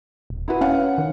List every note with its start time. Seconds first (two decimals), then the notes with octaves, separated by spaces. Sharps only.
0.30 D#1
0.48 E4 F#4 B4
0.61 C#4 F5 F#5
0.98 D#3